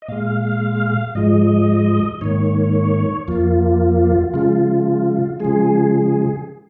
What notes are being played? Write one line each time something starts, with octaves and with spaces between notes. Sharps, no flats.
D#5
A#2 G#3 F5
G#2 F3 G#3 D#5
G#2 D#3 A#3 C#5
F2 F3 A#3 F4
C#3 F3 G#3 F4
C#3 F3 G#3 G#4